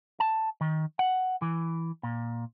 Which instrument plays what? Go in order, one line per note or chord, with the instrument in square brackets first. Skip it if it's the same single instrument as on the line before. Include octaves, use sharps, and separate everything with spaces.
[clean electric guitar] A5
D#3
F#5
E3
A#2